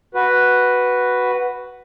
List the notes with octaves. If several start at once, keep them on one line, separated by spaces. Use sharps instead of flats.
F#4 B4